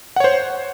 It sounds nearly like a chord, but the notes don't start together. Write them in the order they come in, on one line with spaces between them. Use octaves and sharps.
F#5 C#5 C5